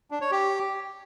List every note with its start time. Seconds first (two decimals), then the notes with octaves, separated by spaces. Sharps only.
0.11 D4
0.21 C#5
0.31 G4